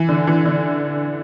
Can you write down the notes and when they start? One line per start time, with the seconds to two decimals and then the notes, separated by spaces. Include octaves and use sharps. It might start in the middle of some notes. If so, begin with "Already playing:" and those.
Already playing: E3
0.09 D3
0.27 E3
0.45 D3